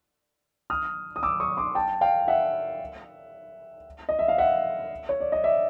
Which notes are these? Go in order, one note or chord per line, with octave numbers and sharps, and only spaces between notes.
D#6 F6
D#6
D6 E6
C#6 D#6
C6 D6
G5 A5
F5 G5
E5 F#5
D#5
E5
F5
E5 F#5
C#5
D5
D#5
D5 E5